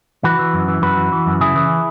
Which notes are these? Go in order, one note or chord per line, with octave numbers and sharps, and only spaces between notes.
E3 F#4 B4
E3
F#2
E3
F#2 F#4 B4
E3
E3
F#2
C#3 E4 G#4
E3